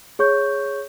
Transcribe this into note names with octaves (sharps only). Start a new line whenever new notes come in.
G#4 C#5 C#6 G6